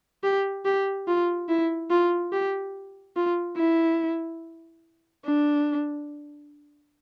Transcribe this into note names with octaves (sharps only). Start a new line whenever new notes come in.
G4
G4
F4
E4
F4
G4
F4
E4
D4